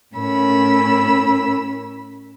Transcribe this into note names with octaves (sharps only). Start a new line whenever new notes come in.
A2 C#4 A#4 B5 E6